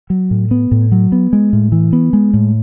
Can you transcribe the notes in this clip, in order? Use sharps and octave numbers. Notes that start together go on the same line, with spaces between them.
F#3
A2
B3
A2
F#3
B3
G#3
A2
E3
B3
G#3
A2